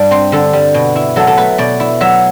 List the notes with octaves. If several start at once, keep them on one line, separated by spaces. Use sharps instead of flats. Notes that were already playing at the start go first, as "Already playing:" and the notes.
Already playing: G2 G3 D5
C4 C5
D3 A4
G3
B2
E4
F#3 A4
A4
A3 B4
B2 D5
E4
F#3 E5